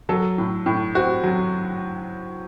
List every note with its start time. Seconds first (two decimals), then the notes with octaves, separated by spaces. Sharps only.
0.09 F#3 A4
0.38 A2
0.66 A2
0.95 C4 F#4
1.23 F#3